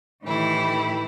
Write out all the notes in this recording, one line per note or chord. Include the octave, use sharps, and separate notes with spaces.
A2 D#3 E3 A3 E4 G4